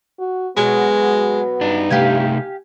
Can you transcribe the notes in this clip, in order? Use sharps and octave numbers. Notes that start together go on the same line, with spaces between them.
F#4
B2 F#3 G#3 B3
G2 D#4 D5
C3 A3 D#4 G4 F5 G#5